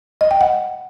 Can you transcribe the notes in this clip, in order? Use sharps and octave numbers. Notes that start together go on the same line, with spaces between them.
D#5
G5
F#5